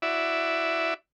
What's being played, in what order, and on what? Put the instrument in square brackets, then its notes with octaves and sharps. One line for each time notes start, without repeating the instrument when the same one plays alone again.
[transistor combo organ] E4 F#4 D5 E5